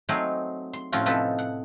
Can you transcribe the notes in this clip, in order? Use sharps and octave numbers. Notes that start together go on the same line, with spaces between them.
F#3 A3 C4 D#4 G#4 A#4
C6
A2 F3 C4 C#4 F4 F#4
C3 F3 D#4 A4 B4
F#5